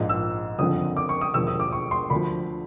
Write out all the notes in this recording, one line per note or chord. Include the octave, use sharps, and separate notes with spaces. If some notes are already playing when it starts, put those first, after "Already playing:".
Already playing: A#1 G#2 F3
E6
F#1 F2 D3 F3 D#6
D6
C#6
D#6
E1 D#2 D3 F3 E6
D#6
D6
C#6
C6
D2 D3 F3 B5